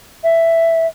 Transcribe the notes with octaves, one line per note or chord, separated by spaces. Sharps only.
E5